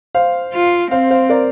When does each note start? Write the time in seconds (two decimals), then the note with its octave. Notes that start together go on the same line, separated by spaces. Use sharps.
0.15 C5 F5
0.54 F4
0.91 C4 C5 F5
1.11 C5 F5
1.29 A#4 D5